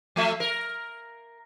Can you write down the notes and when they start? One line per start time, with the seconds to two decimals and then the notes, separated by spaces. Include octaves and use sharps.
0.16 F3 A3 E5
0.40 A#4